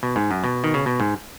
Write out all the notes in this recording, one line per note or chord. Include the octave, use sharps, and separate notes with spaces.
B2
G#2
F#2
B2
D#3
C#3
B2
G#2